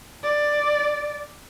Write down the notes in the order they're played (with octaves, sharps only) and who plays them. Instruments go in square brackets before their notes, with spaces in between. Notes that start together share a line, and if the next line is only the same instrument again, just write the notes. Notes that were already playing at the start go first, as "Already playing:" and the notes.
[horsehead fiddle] D5